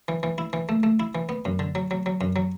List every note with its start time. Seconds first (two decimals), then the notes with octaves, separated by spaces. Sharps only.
0.08 E3
0.23 E3
0.38 E4
0.53 E3
0.69 A3
0.83 A3
1.00 E4
1.15 E3
1.29 B3
1.45 F#2
1.59 D3
1.75 F#3
1.91 F#3
2.06 F#3
2.21 F#2
2.36 F#3